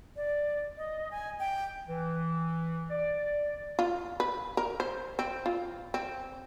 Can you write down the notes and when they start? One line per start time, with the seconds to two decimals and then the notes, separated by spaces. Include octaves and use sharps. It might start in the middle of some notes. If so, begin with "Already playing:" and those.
0.16 D5
0.77 D#5
1.11 G#5
1.39 G5
1.87 E3
2.90 D5
3.79 F4
4.20 B4
4.57 A#4
4.80 C5
5.19 C4
5.46 F4
5.94 C4